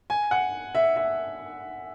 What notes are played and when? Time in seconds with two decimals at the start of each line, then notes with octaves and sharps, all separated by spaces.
0.10 G#5
0.31 F#5
0.75 E5
0.96 E5